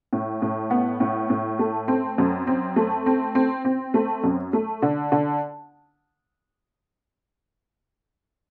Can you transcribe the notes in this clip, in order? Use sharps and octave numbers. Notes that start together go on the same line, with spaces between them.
A2
A2
B3
A2
A2
A3
C4
F#2
C4
A3
C4
C4
C4
A3
F#2
A3
D3
D3